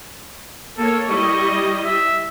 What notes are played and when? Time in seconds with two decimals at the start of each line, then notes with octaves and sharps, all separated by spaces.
0.78 A#3 A4 C#5
1.09 G3 E4 D#5 C#6
1.85 E5